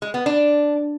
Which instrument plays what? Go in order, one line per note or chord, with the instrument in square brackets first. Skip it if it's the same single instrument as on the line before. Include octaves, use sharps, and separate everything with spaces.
[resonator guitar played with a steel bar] G#3
B3
D4